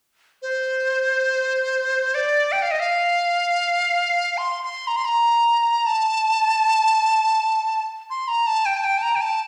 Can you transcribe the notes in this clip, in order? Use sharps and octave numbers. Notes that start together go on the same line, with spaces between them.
C5
D5
G5
F5
D#5
F5
C6
C6
A#5
C6
A#5
A5
C6
A#5
A5
G5
A5
G5
A5
A#5
G5
A5